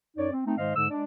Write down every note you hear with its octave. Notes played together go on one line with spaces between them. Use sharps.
F#2 D#4 C#5 D5
C4
A3 C4 D#4
G#2 D#3 G#3 C5 D#5 F5
G#2 D3 G#3 E6
G#3 D4 D5